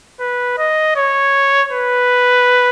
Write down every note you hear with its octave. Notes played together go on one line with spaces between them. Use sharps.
B4
D#5
C#5
B4